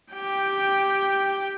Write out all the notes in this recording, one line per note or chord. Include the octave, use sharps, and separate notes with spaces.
G4 G5